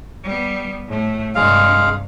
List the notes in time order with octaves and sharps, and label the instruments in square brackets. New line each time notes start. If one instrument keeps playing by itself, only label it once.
[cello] G3 B3
A2 A3
[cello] G2 C3 [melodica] G#3 F5